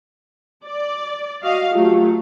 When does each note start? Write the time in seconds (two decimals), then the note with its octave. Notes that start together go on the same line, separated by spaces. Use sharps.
0.65 D5
1.42 F#4 D#5 F5
1.74 F#3 A3 F4 G4